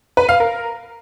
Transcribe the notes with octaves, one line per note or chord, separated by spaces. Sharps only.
B4
F5
A#4